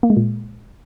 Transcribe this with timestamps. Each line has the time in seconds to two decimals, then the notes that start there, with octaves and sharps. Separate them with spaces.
0.03 A#3
0.10 G#3
0.17 A#2